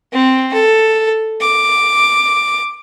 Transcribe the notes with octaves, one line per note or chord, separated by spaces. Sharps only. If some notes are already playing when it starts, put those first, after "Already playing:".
C4
A4
D6